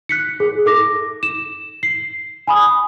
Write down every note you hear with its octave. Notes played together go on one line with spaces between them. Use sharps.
F#6 B6 C#7
G#4
A4 D6 A#6
E7
C7
G#5 B5 D#6